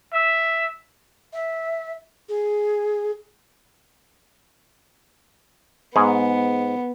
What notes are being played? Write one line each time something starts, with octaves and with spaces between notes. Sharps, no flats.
E5
E5
G#4
G#2 B3 G#4